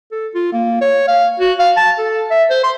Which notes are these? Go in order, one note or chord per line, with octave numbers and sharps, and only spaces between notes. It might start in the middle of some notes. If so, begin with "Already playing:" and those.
A4
F4
A#3
C#5
F5
F#4
F5
A5
A4
E5
C5
C6